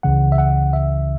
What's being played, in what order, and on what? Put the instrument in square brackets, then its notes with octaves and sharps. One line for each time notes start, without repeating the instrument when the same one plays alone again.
[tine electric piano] C#2 C#3 E3 F#5
E5
F#5
E5